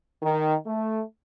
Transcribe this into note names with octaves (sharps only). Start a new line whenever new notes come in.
D#3
A3